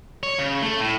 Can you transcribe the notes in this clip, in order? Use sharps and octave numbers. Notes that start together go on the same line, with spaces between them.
C#5
C#3
A3
A2